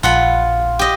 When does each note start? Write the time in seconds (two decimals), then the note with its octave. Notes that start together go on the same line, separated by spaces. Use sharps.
0.03 A#1 F4 F#5 B5
0.79 G4 D#5